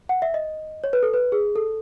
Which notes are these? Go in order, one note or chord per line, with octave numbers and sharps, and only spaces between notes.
F#5
E5
D#5
C#5
B4
A4
B4
G#4
A4